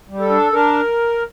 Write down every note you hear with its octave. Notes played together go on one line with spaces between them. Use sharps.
G3
A4
D4
D4 A#4